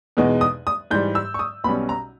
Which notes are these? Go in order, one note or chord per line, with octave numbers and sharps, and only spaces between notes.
E2 B2 G#3 D#4
D#6
D#6
G#2 E3 G3 G6
E6
C#6
D#6
B1 B2 G3 C#4 B5
A#5